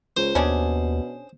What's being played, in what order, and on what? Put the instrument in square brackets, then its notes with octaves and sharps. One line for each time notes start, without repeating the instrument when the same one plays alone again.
[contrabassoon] C#2 [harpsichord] C5
[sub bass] D#2 [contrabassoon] B2 [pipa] C#4 D4 G#4